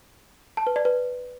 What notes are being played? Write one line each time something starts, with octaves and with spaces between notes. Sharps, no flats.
A5
B4
D5
B4